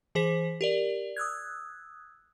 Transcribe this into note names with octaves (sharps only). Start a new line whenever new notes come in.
E3 G#4 C5 B6
G4 A#4 D5
D#6 E6 F#6 G#6